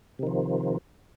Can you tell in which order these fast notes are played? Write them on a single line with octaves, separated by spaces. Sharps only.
C3 D#3 F3